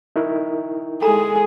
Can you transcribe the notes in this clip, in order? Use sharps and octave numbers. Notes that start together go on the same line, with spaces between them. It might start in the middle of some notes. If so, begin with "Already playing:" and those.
D#4 E4 A#4
G#3 G#4 A4 A#5